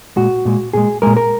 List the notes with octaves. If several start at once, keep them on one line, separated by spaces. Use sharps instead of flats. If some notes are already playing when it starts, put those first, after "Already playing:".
A#2 G#3 F#4
A#2 G#3
A#2 G#3 G#4
A#2 G#3 A#4
A#4